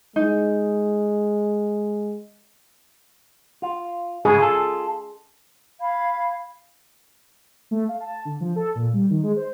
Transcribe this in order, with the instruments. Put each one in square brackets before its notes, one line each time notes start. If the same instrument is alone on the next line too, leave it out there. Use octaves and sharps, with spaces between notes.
[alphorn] G#3 [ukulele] D#4
[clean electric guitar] F4
[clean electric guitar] G#2 C#3 G#3 [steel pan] G#4
[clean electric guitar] F4 A4
[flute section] F5 B5 G#6
[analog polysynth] A3
F5
A5
D3
F3
A4
A#2
G3
D#3
G#3
C5